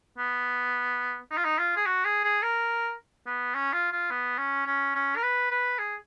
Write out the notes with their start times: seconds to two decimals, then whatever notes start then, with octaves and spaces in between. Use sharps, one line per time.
0.18 B3
1.31 D#4
1.37 F4
1.45 D#4
1.58 F4
1.76 G#4
1.86 F#4
2.05 G#4
2.24 G#4
2.42 A#4
3.26 B3
3.55 C#4
3.73 F4
3.92 F4
4.11 B3
4.38 C#4
4.66 C#4
4.95 C#4
5.16 A#4
5.23 B4
5.50 B4
5.79 G#4